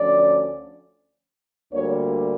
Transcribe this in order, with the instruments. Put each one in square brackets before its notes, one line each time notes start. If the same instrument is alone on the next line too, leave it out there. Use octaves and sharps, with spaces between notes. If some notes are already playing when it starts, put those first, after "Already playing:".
Already playing: [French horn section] D2 D3 F3 C#4 D5
D2 D3 G3 A#3 C#5